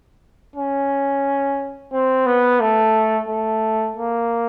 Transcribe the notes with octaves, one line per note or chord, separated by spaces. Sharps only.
C#4
C4
B3
A3
A3
A#3